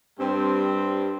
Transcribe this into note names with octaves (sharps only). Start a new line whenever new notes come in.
G2 G3 C4